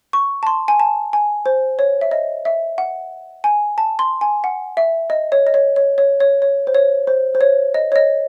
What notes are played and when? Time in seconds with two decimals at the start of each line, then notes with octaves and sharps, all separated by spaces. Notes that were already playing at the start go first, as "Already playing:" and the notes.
0.13 C#6
0.43 A5
0.47 C6
0.68 G#5
0.80 A5
1.13 G#5
1.46 C5
1.79 C#5
2.01 E5
2.11 D#5
2.45 E5
2.78 F#5
3.44 G#5
3.78 A5
3.99 C6
4.21 G#5
4.44 F#5
4.77 E5
5.10 D#5
5.32 C#5
5.47 D#5
5.54 C#5
5.76 C#5
5.98 C#5
6.20 C#5
6.42 C#5
6.67 C5
6.75 C#5
7.07 C5
7.35 C5
7.41 C#5
7.74 D#5
7.92 C#5
7.96 D#5